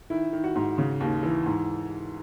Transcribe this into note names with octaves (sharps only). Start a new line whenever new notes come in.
D#3 E4
D#3
F#4
G#2
C#3
D#2
E3
G#2